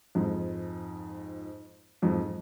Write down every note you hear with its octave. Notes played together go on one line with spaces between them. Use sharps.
F2 G#2
F2 G#2